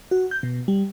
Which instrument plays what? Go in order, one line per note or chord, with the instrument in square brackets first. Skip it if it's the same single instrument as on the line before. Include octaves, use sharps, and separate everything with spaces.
[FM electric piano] F#4
G6
B2
G3